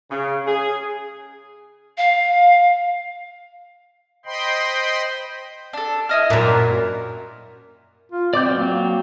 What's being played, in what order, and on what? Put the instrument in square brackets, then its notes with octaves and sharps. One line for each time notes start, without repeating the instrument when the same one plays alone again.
[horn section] C#3
G#4
[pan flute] F5
[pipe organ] C5 D#5 G5 B5 C6
[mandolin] D4 A4
E4 D#5 F6
[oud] F#2 A#2 [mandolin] D4 E4 A#4
[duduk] F4
[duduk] C4 [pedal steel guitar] D5 D6 G6
[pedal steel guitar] F#3 G5
[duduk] A#3